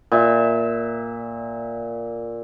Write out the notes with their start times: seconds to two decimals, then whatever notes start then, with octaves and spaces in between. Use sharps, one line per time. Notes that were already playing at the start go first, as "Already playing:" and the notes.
0.12 A#2 E5